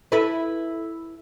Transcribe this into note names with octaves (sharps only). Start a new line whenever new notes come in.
E4 A4 B4